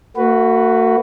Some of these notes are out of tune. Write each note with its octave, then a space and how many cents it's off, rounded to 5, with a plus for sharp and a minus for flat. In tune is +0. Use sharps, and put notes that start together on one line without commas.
A#3 -45 F#4 +0 B4 +0